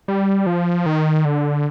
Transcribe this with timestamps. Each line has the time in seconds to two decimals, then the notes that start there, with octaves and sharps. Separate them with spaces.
0.08 G3
0.46 F3
0.86 D#3
1.25 D3